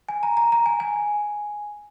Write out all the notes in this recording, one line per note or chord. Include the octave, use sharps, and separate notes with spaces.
G#5
A#5
A#5
A#5
G#5
G#5